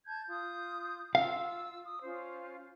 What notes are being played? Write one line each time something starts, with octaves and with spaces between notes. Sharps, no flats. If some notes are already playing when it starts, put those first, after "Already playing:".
A5 G6 G#6
F4 D#6 G6
F4 F5 E6
D#6
C#4 F4 C5